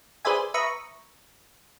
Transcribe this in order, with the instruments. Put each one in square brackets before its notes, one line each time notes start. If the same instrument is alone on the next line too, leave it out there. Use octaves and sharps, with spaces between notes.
[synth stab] G#4 B4 C5 D5 E5 G#5
B4 E5 A#5 C#6 D#6